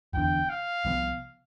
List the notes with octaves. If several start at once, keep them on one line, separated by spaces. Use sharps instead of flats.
F1 E2 D3 G5
F5
C2 C3 F3 B3